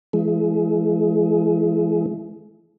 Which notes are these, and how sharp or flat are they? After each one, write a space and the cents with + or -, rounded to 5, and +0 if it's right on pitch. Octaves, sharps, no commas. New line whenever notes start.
E3 +30 G#3 +30